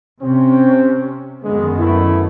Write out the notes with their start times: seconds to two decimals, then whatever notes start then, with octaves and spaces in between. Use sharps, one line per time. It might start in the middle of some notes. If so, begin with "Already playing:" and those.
0.22 C3 C4 C#4
1.43 F#2 D3 D#3 G#3 B3
1.78 D3 A3 E4